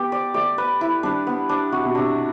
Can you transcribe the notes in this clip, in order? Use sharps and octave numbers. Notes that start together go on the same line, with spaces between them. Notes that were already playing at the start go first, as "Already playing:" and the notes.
Already playing: B3 G4
D5
A3 D5
B4
E4
G3 D4
B3
D4
C3 F#4
B2
C3 D4